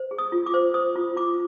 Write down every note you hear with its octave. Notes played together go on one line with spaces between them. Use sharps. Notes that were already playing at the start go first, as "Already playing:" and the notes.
Already playing: C5
G#4
D#6
F4
D6
C5
C5 D#6
F4
F4 D6